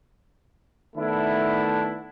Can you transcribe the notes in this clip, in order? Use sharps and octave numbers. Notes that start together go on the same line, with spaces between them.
D#3 A3 B3 D4 E4